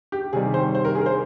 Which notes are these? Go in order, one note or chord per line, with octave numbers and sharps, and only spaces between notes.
G4
C3 D#3 G3 G#4
C5
C5
A#4
G#4
A#4
C5